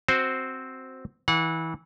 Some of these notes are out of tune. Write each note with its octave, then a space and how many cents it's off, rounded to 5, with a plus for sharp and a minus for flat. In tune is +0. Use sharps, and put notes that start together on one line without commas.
C4 +0 F#4 +0 C5 +0
E3 -25 F#5 -35